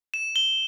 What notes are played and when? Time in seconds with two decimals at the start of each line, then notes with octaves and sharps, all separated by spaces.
0.14 E7
0.36 G7